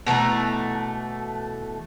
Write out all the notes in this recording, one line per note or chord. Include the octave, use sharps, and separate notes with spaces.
B2 E3 A3 A#5